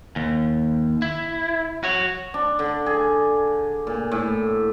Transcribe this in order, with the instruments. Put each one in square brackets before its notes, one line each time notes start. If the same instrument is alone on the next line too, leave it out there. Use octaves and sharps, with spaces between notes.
[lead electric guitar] D#2
E4
F#4 C#5
[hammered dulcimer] D4
D3
G#4
A#2
A2